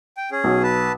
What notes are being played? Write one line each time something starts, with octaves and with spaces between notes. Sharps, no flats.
G5
C#4 G#4
B1
B4 A5